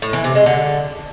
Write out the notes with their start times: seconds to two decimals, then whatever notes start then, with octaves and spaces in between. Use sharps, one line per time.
0.02 A2
0.13 E3
0.24 C3
0.35 G#3
0.46 D3